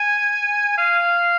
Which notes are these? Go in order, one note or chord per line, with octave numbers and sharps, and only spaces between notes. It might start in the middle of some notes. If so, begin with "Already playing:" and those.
Already playing: G#5
F5